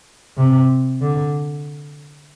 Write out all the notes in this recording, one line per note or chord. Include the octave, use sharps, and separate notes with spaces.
C3
D3